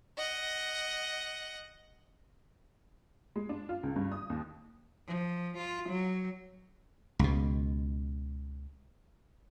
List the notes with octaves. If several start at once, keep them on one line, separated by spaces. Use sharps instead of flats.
D#5 F#5
G#3
D4
F4
C#2
G2
D#6
D#2
F3
F4
F#3
C#2 B2